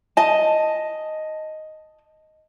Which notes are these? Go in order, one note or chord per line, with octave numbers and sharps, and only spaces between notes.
D#5 A5